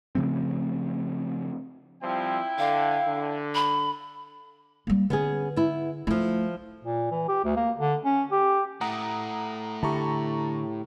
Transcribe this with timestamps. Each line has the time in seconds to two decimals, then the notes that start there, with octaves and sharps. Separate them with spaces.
0.15 C#3 F3 A3 C4
2.03 F3 G3 C4 E4 G5
2.59 D3 F5
3.07 D3
3.55 B5
4.87 G3 A#3
5.10 D3 B3 C#4 G#4
5.56 B3 E4
6.07 F3 A3 E4
6.84 A#2
7.11 E3
7.28 G4
7.44 D2
7.56 A#3
7.78 D3
8.05 C#4
8.31 G4
8.81 A2 A3 F#5 A#5 D#6
9.83 D3 E4 G4 A5 A#5 C#6